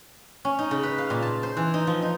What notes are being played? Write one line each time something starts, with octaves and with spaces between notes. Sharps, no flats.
C#4
D#4
C#3
B4
F5
A#2
A5
C5
E3
D#4
F3
D#4